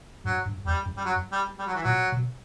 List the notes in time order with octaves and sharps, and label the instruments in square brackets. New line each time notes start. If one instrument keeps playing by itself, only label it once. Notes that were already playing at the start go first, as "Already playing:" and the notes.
[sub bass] G2 [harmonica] F#3
[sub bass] G2
[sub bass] E2 [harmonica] G3
[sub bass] F#2
[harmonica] G3
F#3
G3
G3
F#3
E3
[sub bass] A#2 [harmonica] F#3
[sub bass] B2